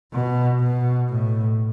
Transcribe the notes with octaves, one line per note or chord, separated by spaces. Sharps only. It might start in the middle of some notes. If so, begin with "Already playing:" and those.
B2
B2
A2